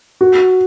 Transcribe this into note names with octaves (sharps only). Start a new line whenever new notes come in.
F#4